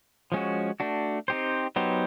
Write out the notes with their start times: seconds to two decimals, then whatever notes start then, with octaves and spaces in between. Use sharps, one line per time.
0.32 F3 G#3 C#4 F#4
0.80 A3 D4 F#4
1.28 C4 D#4 G4 C5
1.76 F#3 B3 D#4 G4 C5